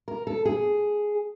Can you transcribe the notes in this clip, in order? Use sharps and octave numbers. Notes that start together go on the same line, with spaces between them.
A#4
A4
G#4